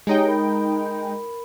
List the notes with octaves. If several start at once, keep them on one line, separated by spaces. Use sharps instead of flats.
G#3 D#4 G4 C#5 G5
A#4 B5